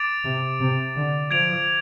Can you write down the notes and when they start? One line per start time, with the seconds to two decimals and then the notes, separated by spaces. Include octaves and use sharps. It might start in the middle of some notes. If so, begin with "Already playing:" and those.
Already playing: D6 A6 D7 F7
0.24 C3
0.60 C3
0.96 D3
1.31 F3 G#6 D7 F7